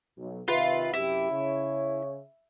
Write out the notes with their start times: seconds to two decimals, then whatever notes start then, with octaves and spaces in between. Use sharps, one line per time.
0.17 B1
0.48 C3 D#3 F4 B4 E5
0.94 F#2 C3 E4 G4
1.31 C#3 C#5